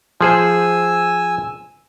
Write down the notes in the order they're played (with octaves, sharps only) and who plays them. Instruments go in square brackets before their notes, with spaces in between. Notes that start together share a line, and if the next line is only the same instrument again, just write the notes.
[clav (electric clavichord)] F3 G#4 C5 [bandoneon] G#5 E6